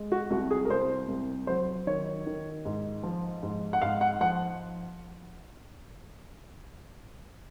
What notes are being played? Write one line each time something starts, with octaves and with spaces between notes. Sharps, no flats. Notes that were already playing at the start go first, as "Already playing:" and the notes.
Already playing: G#3
F#4
C2 F#4
G#4
A#4
C2 C5
C2
F#3 C5
D#3 C#5
D#3
G#2
F3
G#2
F#5
G#2 F5
F#5
F3 F#5